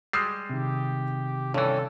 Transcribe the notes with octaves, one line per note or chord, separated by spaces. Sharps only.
G3 G#3 D#6 E6 C7
C3 D#3 G4
G2 E3 C#4 A4